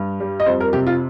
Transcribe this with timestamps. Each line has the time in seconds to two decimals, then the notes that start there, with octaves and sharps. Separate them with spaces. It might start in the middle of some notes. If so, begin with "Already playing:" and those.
Already playing: G2
0.20 G3
0.40 D#5
0.46 F2 C5
0.61 A#4
0.73 C3 G4
0.87 F4